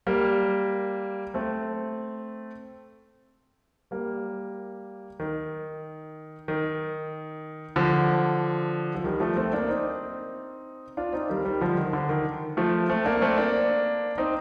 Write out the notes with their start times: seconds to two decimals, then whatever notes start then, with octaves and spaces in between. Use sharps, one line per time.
0.07 G3 A#3
1.34 A3 C4
3.91 G3 A#3
5.20 D#3
6.48 D#3
7.76 D3 F3
8.95 F3
9.04 D#3 G3
9.20 F3 A3
9.37 A3 C4
9.53 A#3 D4
9.69 C4 D#4
10.97 D4 F4
11.13 C4 D#4
11.29 D#3 G3
11.45 D#3 G3
11.61 D3 F3
11.77 D#3
11.93 D3
12.09 D#3
12.57 F3 A3
12.89 A3 C4
13.05 A#3 D4
13.22 A3 C4
13.38 A#3 D4
14.18 C4 D#4